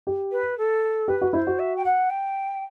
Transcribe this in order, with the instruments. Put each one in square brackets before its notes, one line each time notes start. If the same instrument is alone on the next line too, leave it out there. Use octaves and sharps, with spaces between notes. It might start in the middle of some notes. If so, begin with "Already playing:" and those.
[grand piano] G4
[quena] B4
A4
[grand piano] G4 [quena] B4
[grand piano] F#4
[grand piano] E4 [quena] C5
[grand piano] F#4
[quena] E5
G5
F#5
G5